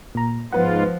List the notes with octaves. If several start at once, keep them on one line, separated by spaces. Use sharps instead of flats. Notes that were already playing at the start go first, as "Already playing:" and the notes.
A#2 A#5
G#2 F3 B3 F4 B4 F#5